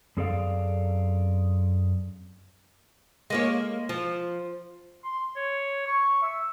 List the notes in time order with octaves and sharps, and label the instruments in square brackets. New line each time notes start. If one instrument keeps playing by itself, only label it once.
[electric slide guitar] F#2 C4 G#4 A4 D5 F5
[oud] G#3 A#3 C#5
F3
[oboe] C6
C#5
C#6
E5